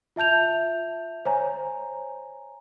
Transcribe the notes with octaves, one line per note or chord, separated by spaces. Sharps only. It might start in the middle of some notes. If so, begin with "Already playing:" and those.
F4 E5 A5 G6 F7
C5 C#5 G#5 A#5